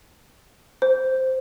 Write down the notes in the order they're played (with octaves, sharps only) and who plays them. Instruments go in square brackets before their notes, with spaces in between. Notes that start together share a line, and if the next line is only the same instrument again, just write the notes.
[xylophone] C5